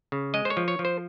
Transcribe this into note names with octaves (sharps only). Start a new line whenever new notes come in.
C#3
G#3 D#5
C5
C#5
F3
C#5
F3
C5